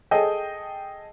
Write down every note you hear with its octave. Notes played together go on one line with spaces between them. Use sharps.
G#4 A4 D#5 G5